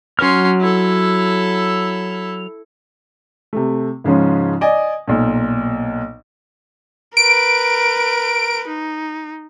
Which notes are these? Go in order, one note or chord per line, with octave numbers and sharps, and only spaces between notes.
F#3 C#4 C6 F6
E4 A4
C3 A3
G#2 C#3 F3 G#3 C#4
D5 D#5 G#5
B1 A#2
A#4 B4 D7
D#4